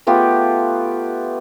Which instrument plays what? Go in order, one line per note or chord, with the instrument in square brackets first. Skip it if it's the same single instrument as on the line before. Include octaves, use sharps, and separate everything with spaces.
[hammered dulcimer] A3 B3 F4 G4